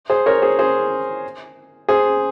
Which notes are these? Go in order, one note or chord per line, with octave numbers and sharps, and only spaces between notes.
G#4 C5
A#4 C#5
G#4 C5
G#4 C5
G#4 C5